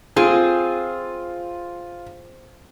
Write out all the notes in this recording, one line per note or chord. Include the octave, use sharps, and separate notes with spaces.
C4 F4 G#4